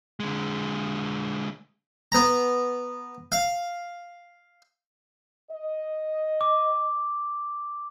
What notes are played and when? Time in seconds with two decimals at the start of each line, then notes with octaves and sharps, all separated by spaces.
0.20 D3 G#3
2.12 B3 A#5
3.32 F5
5.51 D#5
6.41 D6